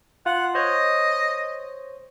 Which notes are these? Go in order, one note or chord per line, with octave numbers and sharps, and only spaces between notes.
F4 F#5
C5 C#5 D#5